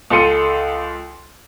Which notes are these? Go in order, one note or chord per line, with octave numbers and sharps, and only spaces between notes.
C#2 A4 C6 C#7 D#7